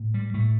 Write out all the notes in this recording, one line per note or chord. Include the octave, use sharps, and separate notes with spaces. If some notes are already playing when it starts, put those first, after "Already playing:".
Already playing: A2
G3
A2 A3